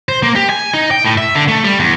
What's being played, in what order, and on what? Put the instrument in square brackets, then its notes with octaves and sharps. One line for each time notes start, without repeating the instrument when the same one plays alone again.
[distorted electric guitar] C5
A#3
G4
G#5
D#4
G5
A2
E5
D3
A3
G3
E2